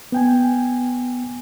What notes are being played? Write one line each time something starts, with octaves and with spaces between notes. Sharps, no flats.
B3 G5 G#5